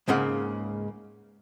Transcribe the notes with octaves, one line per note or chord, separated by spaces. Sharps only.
C#2 G#2 C#3 A#3 F#5